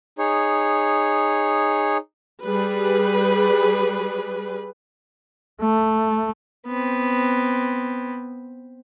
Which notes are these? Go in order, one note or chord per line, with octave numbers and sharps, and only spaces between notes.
D#4 G#4 C#5
G3 G#4 B4
A3
B3 C4